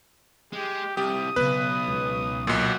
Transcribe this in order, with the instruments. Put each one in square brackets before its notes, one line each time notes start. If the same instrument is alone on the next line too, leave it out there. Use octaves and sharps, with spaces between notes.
[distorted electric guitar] G#3 [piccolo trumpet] G4
[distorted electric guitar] C2 [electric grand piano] G4 [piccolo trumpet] D#6
[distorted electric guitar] B1 [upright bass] C#3 B3 [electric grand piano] B4
[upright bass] C#2
[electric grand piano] B1 A#2 [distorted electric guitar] F#4